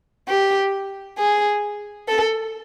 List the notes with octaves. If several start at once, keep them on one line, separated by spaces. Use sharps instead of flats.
G4
G#4
A4